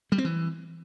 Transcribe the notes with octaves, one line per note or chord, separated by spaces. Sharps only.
G3
C4
E3